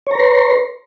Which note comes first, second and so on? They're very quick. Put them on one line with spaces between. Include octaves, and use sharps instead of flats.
C#5 A#5 B4 C6